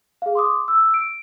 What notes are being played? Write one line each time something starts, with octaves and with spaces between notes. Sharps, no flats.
G#4 F5
C6 D6 D#6
E6
D7